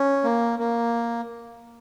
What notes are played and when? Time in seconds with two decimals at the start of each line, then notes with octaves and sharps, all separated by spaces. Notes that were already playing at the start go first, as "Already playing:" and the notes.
Already playing: C#4
0.24 A#3
0.59 A#3